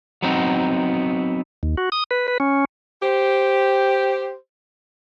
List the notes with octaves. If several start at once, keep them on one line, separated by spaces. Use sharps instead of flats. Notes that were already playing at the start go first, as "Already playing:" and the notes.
F#3 B3 C4 D#4
D#2
F#4
D#6
B4
B4
C#4
G4 C5